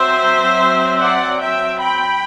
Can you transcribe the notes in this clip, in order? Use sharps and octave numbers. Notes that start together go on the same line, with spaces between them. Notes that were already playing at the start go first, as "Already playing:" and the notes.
Already playing: F#3 C4 C5 E5
D5 F#5
E5 G5
G5 B5